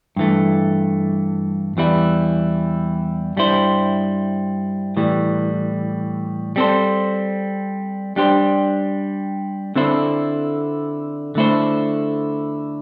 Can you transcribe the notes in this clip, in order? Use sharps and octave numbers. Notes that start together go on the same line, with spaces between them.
G2 E3 A3
E2 E3 G3 E4
G2 G3 E4 C5
A2 E3 G3
G3 C4 A4 C5
G3 D4 G4 C5
D3 C4 E4 A4 C5
D3 A3 E4 A4 C5